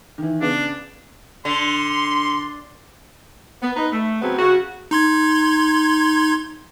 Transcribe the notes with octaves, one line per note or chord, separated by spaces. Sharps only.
D#3 E3
C#3 B3 D4
D3 C6
B3
D#4 B4
A3
C#3 F#3 B3 C4
C#3 F#4
D#4 C6 G#6